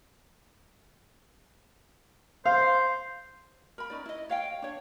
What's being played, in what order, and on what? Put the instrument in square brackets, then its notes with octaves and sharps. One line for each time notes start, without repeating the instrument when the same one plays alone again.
[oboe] C5 [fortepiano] F5
[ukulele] A#4 B5
C#4 D#4 D5
E4 D#5
C#5 F5 G5
D4 C#5